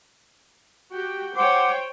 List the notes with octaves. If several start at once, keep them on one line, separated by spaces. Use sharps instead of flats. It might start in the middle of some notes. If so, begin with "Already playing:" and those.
F#4 G4 G5
C5 C#5 F#5 G5 D6